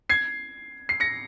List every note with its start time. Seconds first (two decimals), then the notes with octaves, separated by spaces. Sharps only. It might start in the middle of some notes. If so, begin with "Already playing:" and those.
0.10 G#6 C7
0.89 C7
1.00 A#6 C#7